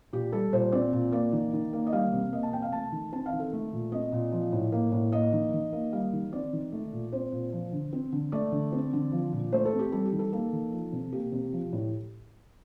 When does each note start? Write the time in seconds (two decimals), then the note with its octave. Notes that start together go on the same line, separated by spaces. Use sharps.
0.13 A#2 G4
0.32 G3 A4
0.53 A#2 C5
0.72 C4 D5
0.93 A#2
1.12 A#3 D5
1.32 D#3
1.53 D#3
1.73 A#3
1.87 D#5
1.93 G3 F5
2.13 C3
2.33 A#3 D#5
2.43 A5
2.53 C3 G5
2.62 F5
2.72 A3 A5
2.92 D#3
3.13 C4 A5
3.26 F5
3.33 D#3
3.40 A4
3.53 A3
3.73 A#2
3.92 C4 D#5
4.12 A#2
4.32 F3
4.53 A2
4.72 A#3
4.92 A2
5.12 A#3 D#5
5.33 D#3
5.53 D#3
5.72 A#3
5.93 G3 F5
6.13 D#3
6.32 C4 D5
6.53 D#3
6.72 A3
6.93 A#2
7.12 C4 C5
7.32 A#2
7.53 F3
7.72 D3
7.93 C4
8.12 D3
8.32 A3 D5
8.52 D3
8.72 C4
8.93 D3
9.12 F3
9.33 A#2
9.52 A3 C5
9.65 A4
9.73 C4
9.79 G4
9.92 G3 A4
10.05 G4
10.12 D#3
10.19 A4
10.33 A#3 A4
10.53 D#3
10.72 F3
10.93 C3
11.12 A#3 G4
11.32 C3
11.53 F3
11.73 A2